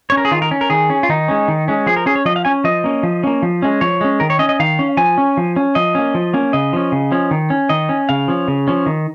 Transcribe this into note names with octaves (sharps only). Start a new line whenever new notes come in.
C#4 C#5
A#4
G#4
D#3 F4
A#4
C#4
A#4
D#3 G#4
C#4
F4
D#3 D#4
G#3 C#4
D#3
G#3 C#4
F3 G#4
A#4
C#4 G#4
C#5
F3 D#5
F5
C#4 G#5
F3 D#5
A#3 C#4
F3
A#3 C#4
F3
G#3 C#4
F3 C#5
G#3 C#4
D#3 A#4
C#5
C#4 D#5
D#5
D#3 F5
C#4
F3 G#5
C#4
F3
C#4
F3 D#5
A#3 C#4
F3
A#3 C#4
C#3 D#5
F3 C#4
C#3
F3 C#4
D#3
C#4
D#3 D#5
C#4
C#3 F5
F3 C#4
C#3
F3 C#4
D#3